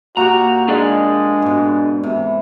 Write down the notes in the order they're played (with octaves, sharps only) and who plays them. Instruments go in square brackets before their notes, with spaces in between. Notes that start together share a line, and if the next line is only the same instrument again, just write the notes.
[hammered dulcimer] A#2 G4 [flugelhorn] F#4 [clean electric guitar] A#5
[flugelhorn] G#3 [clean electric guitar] D4 G#4 D5
[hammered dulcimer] G#2 B2
C3 E3